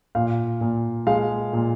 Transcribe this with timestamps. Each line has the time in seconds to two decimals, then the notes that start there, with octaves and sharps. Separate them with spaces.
0.15 A#2 F5
0.61 A#2
1.07 G#3 F5
1.53 A#2